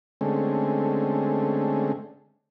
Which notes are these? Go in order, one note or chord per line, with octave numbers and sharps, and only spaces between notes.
D3 G#3 A3 C4 C#4